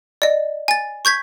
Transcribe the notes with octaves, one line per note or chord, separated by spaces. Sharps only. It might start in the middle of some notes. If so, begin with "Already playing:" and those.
D5 D#5
G#5 A6
C#6 G6 G#6 B6